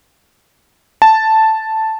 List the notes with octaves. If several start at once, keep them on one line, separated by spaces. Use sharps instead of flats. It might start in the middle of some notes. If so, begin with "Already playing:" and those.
A5